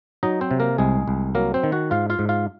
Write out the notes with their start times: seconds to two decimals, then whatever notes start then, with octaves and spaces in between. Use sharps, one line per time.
0.23 F#3 D#4 D#5
0.41 C4 C5
0.51 C3
0.60 A#3 A#4
0.78 C2 G#3 G#4
1.08 C2
1.35 F#3 A#3 A#4
1.54 C4 C5
1.63 D#3
1.72 F#4 F#5
1.91 G#2 F4 F5
2.10 F4 F5
2.19 G#2
2.29 F4 F5